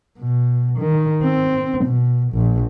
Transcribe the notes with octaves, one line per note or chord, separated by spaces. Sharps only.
B2
D#3
C4
B2
A#1